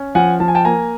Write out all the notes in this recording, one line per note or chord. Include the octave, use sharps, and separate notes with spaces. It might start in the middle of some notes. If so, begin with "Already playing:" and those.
Already playing: C#4
F3 F#5 G#5
F3 A5
G#5
G5 A5
A#3 G#5 A#5